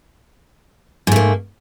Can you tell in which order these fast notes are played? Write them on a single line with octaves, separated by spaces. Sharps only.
G#2 A3 A#3